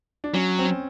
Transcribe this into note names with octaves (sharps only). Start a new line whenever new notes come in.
D4
F#3 C#4
C4
C#4